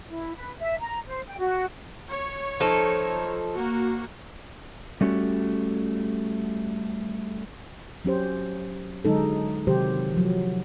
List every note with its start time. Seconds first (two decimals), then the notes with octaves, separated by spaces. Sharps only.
0.08 E4
0.36 B4
0.59 E5
0.81 A#5
1.07 C5
1.27 G5
1.39 F#4
2.08 C#5
2.60 F3 D#4 A4
3.54 A#3 F#4
5.01 G3 A3 C#4 F#4 G4
8.05 F#3 C#4 G4 C5
9.05 D3 F#3 G#3 D#4 A4
9.67 C3 D#3 F#3 G4 C5
10.14 F3 F#3